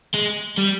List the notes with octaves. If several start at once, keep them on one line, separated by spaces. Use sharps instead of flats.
G#3
G3